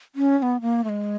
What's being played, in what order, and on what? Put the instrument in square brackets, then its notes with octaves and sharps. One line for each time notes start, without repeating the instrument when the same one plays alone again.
[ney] C#4
C#4
B3
A#3
A3
G#3